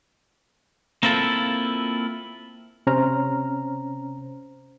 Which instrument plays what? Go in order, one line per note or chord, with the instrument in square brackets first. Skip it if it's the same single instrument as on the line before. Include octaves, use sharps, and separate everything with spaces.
[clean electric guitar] A#3 C4 E4 F4 A4
[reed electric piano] C3 C#4 C5 A#5 F6